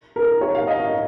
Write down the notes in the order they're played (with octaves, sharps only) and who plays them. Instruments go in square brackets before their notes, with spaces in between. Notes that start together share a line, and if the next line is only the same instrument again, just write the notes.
[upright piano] A#4
C#5
F5
D#5
F5